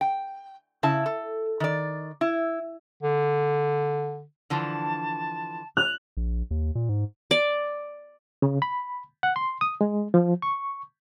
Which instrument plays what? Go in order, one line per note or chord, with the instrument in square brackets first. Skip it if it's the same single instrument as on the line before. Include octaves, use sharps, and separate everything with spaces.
[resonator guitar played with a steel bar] G5
C#3 E4 A5
A4
D#3 D5
E4
[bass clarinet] D3
[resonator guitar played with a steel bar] D3 E3 F3 [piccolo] A5
[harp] F#6 [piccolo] F7
[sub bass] A#1
D#2
A#2
G#2
[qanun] D5
[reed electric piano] C#3
B5
F#5
C6
D#6
G#3
F3
C#6